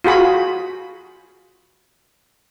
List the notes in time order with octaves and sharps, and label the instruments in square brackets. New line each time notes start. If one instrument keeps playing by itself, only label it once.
[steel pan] F4 F#4 G#4 B5